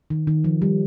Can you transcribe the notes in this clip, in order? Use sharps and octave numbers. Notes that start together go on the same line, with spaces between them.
D#3
D#3
F3
G3